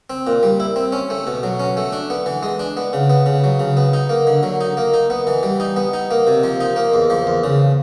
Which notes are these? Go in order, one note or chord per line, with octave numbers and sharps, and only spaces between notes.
C4
A#2
G3
E4
C4
C#4
A3
B2
F#3
C#4
A3
D4
B3
E3
G#3
D4
B3
C#3
B3
C#3
F#3
C#3
B3
D#4
A#3
D3
F#3
D#4
A#3
D#4
B3
E3
G3
D#4
B3
D#4
A#3
C3
F3
D#4
A#3
E2
F3
E2
C#3